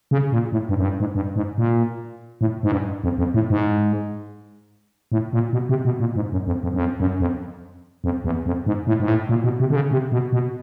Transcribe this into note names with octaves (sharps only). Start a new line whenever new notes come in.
C#3
A#2
A2
G2
F#2
G2
G#2
G2
G#2
A#2
A2
G#2
G2
F2
F2
A2
G#2
A2
A#2
B2
C3
B2
A#2
G#2
F#2
F2
F2
F#2
F2
F#2
F2
F2
E2
F2
G#2
A2
G#2
A2
A#2
B2
C3
D3
C#3
C3
B2
B2